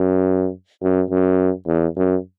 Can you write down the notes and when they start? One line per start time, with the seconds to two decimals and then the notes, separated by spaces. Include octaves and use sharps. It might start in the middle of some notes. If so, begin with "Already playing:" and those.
Already playing: F#2
0.82 F#2
1.11 F#2
1.67 E2
1.96 F#2